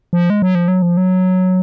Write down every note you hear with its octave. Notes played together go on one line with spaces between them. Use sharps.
F3
G#3
F#3
F3
F#3
F3
F#3